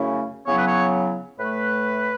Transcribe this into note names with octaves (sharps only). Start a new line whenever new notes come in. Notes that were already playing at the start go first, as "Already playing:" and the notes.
Already playing: F#2 C#3 A3 C#4 E4
C#3 F#3 B3 E4 C#5
B4
C#5
A2 A3 B4